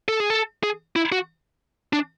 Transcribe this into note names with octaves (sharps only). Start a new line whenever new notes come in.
A4
G#4
A4
G#4
E4
F#4
D4